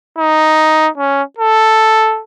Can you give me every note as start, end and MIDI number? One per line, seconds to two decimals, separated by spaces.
0.18 0.89 63
0.97 1.22 61
1.38 2.22 69